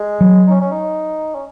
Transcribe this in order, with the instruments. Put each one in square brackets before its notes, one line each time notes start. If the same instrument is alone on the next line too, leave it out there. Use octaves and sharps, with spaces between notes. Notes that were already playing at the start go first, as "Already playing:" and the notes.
Already playing: [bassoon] G#3
[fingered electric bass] F#3
[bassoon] D#4
C#4
C#4
D#4
C#4